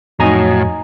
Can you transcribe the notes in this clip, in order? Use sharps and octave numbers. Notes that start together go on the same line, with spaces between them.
F2 A2 F#3 D#4 G#5 A#5